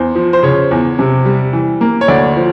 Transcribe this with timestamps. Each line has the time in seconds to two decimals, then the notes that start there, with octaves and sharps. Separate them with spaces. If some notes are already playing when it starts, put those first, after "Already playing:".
Already playing: E2 C5
0.15 F3
0.33 C5
0.43 C#3 C#5
0.71 E2
0.99 C3
1.25 G3
1.53 E3
1.81 A#3
2.01 C#5
2.08 D2 D5
2.37 F3